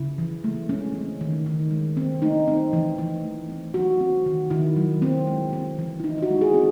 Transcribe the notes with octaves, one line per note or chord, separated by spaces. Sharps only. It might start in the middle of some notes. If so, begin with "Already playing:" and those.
Already playing: C#3 E4
E3
A3
G#3 C#4
C4
D#3
D#3
G#3
C4
A3 D#4
C4
E3
E3
A3
C4
F#3 F#4
C4
D#3
D#3 E4
F#3
C4
G#3
C4
E3
E4
E3 D#4
E4
F#4
G#3
G#4
C4